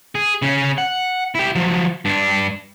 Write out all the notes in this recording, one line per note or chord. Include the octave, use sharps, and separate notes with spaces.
G#4
C#3 C#4
F#5
E4 G4
F3 F#3
G2 D4